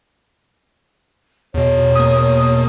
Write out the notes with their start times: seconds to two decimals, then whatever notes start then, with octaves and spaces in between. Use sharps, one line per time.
1.54 E2 B2 C#5
1.95 A#3 D#6